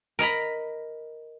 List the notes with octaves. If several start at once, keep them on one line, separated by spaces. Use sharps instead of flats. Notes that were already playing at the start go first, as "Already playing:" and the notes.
A#4 D#5 A#5 B5